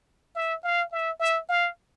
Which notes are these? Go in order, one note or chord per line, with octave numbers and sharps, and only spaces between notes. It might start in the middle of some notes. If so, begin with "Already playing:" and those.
E5
F5
E5
E5
F5